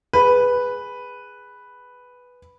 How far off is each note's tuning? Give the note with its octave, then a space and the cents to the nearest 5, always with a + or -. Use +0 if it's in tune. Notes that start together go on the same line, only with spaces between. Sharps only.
G#4 -5 B4 +0